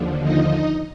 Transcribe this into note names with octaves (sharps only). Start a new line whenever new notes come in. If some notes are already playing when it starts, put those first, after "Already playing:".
Already playing: D#2 D3 F3
D#4 D#5